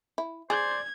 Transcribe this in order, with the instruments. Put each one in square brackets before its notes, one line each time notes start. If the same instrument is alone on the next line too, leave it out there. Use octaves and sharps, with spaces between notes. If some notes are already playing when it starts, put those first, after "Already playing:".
[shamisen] E4
[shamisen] G#4 [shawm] C5 [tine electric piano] D5 [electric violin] G#6